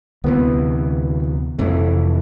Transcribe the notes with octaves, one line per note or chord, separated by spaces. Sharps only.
D2 C3 E3 B3
F1 F2 E3 A3